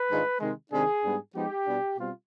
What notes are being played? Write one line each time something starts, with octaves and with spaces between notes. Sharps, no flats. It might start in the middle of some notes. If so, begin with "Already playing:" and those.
Already playing: B4
G#2 D#3 G#3 D4 F4
C3 D#3 G#3
C3 D#3 G#3 D4 G#4
G#2 G3 B3 D4
F3 G#3 B3 D#4 G4
B2 G3 D4
B2 G3 C4 F4